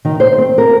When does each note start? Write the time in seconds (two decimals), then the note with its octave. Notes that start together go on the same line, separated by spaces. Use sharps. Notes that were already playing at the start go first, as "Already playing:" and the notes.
0.05 D#3
0.20 C5
0.38 C4
0.58 A#4